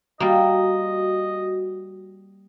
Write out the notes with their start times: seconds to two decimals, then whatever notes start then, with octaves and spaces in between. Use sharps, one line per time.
0.20 G3 A#3 F#4 D#5